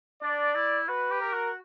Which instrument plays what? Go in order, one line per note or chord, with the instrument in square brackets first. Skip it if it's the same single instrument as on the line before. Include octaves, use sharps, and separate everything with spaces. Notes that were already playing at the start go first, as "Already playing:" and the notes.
[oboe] D4 [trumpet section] D5
[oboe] E4
[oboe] F#4 [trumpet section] B4
[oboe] G4
[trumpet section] A#4
[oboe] F#4